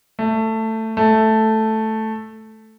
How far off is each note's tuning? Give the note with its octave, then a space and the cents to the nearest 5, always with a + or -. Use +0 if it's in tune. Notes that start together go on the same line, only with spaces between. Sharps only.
A3 +15
A3 +0